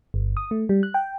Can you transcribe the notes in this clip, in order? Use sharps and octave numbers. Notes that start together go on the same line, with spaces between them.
G1
D#6
A3
G3
F#6
G5